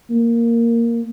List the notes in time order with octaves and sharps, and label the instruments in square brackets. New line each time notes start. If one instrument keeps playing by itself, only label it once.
[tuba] A#3